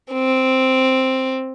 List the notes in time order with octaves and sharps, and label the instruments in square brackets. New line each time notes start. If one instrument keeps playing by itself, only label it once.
[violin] C4